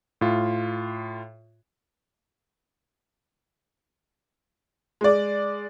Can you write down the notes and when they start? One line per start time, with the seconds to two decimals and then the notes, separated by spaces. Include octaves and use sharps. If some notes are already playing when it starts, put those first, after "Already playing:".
0.21 A2 F4
5.01 G#3 D5